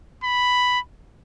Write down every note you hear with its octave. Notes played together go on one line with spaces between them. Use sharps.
B5